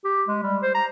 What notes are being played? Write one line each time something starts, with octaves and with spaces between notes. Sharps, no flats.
G4
G#3
G3
C5
A#5